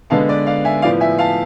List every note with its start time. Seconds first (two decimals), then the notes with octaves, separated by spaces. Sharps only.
0.10 D3 G#3 B3 F5 A5
0.29 B4 D5
0.46 D5 F5
0.65 E5 G#5
0.82 A2 F3 B3 D5 F5
1.00 E5 G#5
1.18 F5 A5